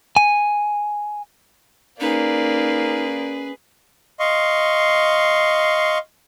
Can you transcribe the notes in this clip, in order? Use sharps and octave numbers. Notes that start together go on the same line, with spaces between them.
G#5
A#3 C#4 D#4 G#4 B4 D5
D#5 F5 C6 C#6